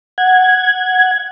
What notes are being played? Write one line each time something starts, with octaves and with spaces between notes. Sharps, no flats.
F#5 G#6